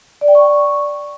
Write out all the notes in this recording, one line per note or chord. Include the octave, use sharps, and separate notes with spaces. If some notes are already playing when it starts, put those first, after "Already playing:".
D5
G5
C#6